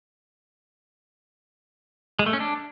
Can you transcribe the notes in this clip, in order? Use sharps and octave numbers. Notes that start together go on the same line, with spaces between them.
G#3
A3
C#4
D4